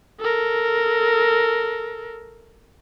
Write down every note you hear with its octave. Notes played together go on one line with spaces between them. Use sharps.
A4 A#4